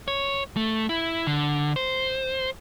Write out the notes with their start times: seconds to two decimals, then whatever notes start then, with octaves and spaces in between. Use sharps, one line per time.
0.08 C#5
0.56 A3
0.89 E4
1.27 D3
1.76 C5